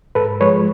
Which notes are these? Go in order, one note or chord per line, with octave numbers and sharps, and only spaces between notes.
G#2 A4 B4
F3 G#3 B4 C#5